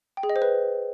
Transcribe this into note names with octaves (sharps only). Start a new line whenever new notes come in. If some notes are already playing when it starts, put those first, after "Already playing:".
G5
G#4
D#5
C5
B4